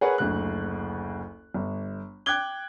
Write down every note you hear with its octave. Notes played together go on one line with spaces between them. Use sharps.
G#4 A#4 B4 C#5 F#5
F#1 D2 F#6
G1
G5 D6 F#6 G#6 G7